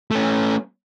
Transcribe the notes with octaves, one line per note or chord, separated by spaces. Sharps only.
A3 C#4